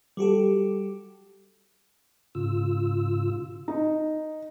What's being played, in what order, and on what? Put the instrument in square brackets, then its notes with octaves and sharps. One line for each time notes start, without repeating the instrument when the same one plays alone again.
[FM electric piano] G3 F#4 G4 A4
[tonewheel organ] G#2 C#3 F4 E6
[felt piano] D#4